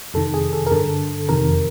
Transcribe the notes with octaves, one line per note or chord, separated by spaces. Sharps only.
F2 C3 D#3 A4
G#4
A4
A#4
G2 D3 A4
F2 C3 D#3 A#4